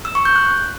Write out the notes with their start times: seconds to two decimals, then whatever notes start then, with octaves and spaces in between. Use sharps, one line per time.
0.05 E6
0.15 C#6
0.25 G6
0.36 F#6